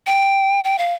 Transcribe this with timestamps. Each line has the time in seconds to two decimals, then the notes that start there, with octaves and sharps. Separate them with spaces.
0.07 G5
0.64 G5
0.78 F5